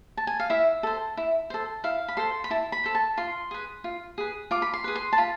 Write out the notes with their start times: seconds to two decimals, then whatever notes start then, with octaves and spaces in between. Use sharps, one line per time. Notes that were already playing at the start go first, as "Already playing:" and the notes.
0.17 A5
0.27 G#5
0.40 F5
0.50 E4 E5
0.83 A4 C5
1.17 E4
1.50 A4 C5
1.84 E4 F5
2.08 B5
2.17 A4 C5 C6
2.44 B5
2.50 E4 A5
2.72 B5
2.84 A4 C5
2.95 A5
3.17 F4 C6
3.51 G#4 B4
3.84 F4
4.18 G#4 B4
4.51 F4 D6
4.62 B5
4.74 C6
4.84 G#4 B4
4.96 C6
5.13 A5
5.18 F4 B5